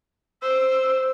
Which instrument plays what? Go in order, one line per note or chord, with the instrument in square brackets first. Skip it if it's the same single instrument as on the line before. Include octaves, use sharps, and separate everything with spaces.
[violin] C5 [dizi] E6